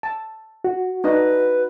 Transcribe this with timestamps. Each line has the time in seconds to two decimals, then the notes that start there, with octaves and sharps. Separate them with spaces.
0.03 A5
0.64 F#4
1.04 D4 D#4 B4 D#5